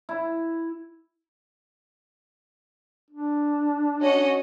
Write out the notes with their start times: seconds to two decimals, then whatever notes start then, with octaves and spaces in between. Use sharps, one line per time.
0.09 E4
3.10 D4
4.01 C#4 F#4 D#5